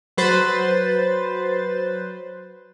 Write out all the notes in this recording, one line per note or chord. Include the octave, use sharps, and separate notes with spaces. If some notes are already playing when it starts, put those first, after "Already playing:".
F#3 B4 C5 A6